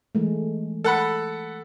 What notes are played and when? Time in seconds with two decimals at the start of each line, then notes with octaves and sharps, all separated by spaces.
0.15 E3 G#3 A3
0.84 A4 F#5 B5